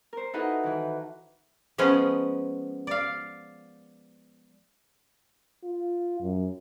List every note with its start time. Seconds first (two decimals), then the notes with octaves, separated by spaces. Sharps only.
0.13 A#4 C5
0.34 D#4 E4 F#4 A4 B4 D#5
0.63 D#3 E3
1.78 F3 G#3 B3 C#4
2.87 D5 F5
5.63 F4
6.20 F#2